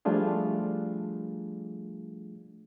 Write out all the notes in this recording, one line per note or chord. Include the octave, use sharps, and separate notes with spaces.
F3 G3 A3 D4 F4 G#4